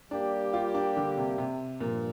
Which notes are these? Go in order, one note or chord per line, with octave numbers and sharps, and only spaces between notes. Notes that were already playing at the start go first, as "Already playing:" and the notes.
G3 A#3 D4 G4
F4
D4
D3
C3
C3
G2 A#2 F3